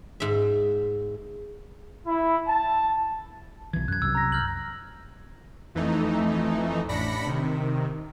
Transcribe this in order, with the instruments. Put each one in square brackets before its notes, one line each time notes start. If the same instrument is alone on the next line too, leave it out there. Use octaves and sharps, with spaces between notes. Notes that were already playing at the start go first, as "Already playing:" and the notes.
[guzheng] G#2 E5
[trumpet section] E4
A5
[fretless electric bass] B1 E3 [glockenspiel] G#6
[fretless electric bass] F#2 [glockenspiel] F#6 G#6
[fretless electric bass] C2 F#2 [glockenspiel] E6
[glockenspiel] A#5 A#6
F6 G6 F#7
[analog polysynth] F2 E3 A3 D#4
A1 D4 B5 A#6 B6 C#7
C3 D#3